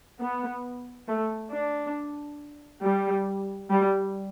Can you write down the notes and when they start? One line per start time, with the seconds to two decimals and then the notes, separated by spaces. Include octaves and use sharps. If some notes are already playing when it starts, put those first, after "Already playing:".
0.20 B3
1.08 A3
1.52 D4
2.83 G3
3.70 G3